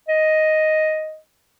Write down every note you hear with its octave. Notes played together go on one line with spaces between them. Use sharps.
D#5